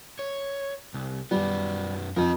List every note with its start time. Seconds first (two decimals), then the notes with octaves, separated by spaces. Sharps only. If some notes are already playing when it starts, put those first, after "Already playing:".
0.19 C#5
0.94 C2
1.31 F#2 G3 B3
2.16 F2 A#4 D#5